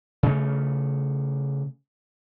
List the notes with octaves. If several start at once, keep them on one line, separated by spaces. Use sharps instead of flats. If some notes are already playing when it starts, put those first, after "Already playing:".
C#3 A3